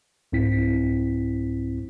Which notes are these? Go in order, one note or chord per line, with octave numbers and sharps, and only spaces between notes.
C2 G#2 C4 E4 B6